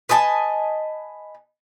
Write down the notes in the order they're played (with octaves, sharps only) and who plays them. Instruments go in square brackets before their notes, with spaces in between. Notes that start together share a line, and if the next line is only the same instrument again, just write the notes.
[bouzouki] B4 D#5 G#5 A5